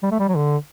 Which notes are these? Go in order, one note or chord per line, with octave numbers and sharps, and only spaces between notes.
G3
A3
G3
F#3
D3